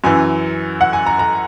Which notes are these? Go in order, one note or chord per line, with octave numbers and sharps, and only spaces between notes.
F#2 E3 G#5
F#5
G#5
A#5
A#5